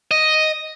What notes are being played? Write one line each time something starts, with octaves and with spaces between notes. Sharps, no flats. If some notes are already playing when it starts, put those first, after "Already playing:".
D#5